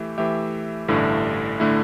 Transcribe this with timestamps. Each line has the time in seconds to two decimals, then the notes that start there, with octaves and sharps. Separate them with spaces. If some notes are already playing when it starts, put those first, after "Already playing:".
Already playing: E3 A3 G4 E5
0.18 E3 A3 G4 E5
0.88 A1 G2 D3 A3 E4
1.60 D3 A3 E4